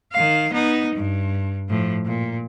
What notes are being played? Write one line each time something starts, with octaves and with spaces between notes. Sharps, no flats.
D#3 F5
B3 D#4
G2
A2 F3
A#2